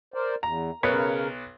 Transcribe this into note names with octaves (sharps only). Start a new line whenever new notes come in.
A#4 C5 D5
E2 A#5
B1 C#3 A#4 B4 C#5